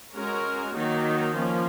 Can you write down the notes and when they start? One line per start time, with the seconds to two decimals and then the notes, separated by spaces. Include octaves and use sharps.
0.14 G#3 C#4 F#4 A#4
0.74 D#3 F#3 A#3 D#4
1.35 F3 A#3 C#4